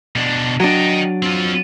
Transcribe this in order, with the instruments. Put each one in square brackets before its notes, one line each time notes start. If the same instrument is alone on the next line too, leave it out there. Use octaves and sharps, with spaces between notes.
[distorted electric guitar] B2 D4
[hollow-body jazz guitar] F#3 D4 [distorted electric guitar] D#5 G5
[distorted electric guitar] C4 F4